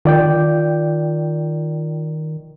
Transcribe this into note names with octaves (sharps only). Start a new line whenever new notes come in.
D#3 F4 D5 G5